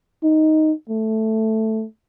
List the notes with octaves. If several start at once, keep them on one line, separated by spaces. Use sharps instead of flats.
D#4
A3